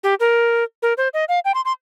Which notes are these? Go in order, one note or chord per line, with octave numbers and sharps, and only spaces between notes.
G4
A#4
A#4
C5
D#5
F5
G5
C6
C6